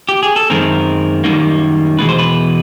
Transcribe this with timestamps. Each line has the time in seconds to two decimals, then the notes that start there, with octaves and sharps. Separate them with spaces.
0.09 G4
0.23 G#4
0.36 A4
0.50 F#2 D#3 G#3 C4 A#4
1.24 F#2 D#3 G3 A#3
1.98 E2 B2 G#3 B4
2.09 C5
2.19 B4